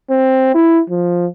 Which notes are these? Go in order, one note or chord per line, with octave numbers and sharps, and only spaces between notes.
C4
E4
F3